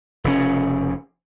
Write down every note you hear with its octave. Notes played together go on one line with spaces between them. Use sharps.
F1 C#3 C#4